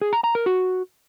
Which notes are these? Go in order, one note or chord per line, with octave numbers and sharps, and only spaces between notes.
G#4
A#5
A#5
A#4
F#4